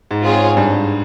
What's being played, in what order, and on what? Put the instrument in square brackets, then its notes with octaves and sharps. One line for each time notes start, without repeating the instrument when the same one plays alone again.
[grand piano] G#2
[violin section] C4 F4 G#4 C#5
[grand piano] G2